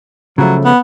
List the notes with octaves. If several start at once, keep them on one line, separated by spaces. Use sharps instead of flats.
C#3 F3 F#3 A3
B3